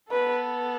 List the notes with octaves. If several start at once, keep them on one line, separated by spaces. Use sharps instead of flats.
B3 A4 B4